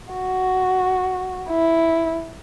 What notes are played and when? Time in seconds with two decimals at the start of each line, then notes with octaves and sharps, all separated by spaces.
0.13 F#4
1.49 E4